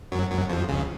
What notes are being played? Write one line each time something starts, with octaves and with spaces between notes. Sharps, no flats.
F#2 F#3
F#2 F#3
F2 F3
C#2 C#3